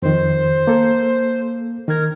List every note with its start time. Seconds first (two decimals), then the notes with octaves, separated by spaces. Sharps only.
0.02 F2 D#3 C5
0.67 A#3 A4
1.88 D#3 A#4 G#6